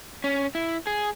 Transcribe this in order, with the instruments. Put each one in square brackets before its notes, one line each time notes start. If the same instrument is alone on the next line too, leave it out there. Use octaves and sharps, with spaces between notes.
[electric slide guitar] C#4
E4
G#4